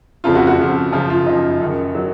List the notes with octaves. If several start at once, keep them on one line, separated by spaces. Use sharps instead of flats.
F2 C#3 F3 F4
F#4
F#4
F2 C#3 F3
F#2 C#3 F3 F4
F4
F#2 C#3 F3 D#4
F#2 D#3
D#3 F#3